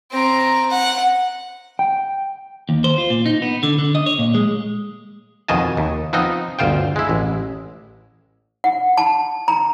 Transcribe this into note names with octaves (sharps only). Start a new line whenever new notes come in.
C4 A#5
F#5
G5
D#2
C5
F4
A#2
D#4
B3
D3
D3
D#5
C#5
A#2
G#3
F2 B2 D#3 D#5 G#5 A5
D#2
F3 B3 C4 D#4 D#5
G1 D2 F4 C5 G5
G#3 E4
A1
F#5
A5
A#5